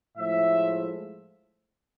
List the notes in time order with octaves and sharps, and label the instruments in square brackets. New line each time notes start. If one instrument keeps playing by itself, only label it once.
[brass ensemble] A2 F3 G#3 E5